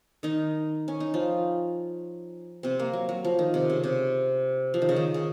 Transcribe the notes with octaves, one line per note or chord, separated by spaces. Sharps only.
D#3 D#4
C#4
D#4
F3 F4
C3 C4
A#3
F#3
F#3
F3
D#3
C3
C#3
C3
F3
D#3
C#3
D#3
C#3